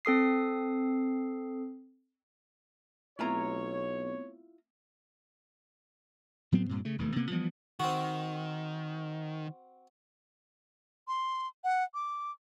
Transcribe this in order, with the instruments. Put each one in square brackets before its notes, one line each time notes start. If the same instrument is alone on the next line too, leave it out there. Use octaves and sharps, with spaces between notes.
[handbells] C4 A4 D#6 C7
[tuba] B1 [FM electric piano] A3 B3 C4 [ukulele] E4 F4 A#5 [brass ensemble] C#5
[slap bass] A2 F#3 B3 C4
G2 A#2 C4
C#3 A3
E1 D#2 E3 A3
C3 A#3 B3
E3 F3 G3 B3
[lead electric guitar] D#3 [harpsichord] C4 F#4
[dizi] C6
F#5
D6